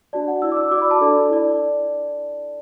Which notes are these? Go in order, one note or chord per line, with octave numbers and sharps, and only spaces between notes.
D4 F#4 D5 A5
F#5
E4 D5 E6
D6
E6
F#4 D5 D6
B5
A5
D4 A4 D5
E4 D5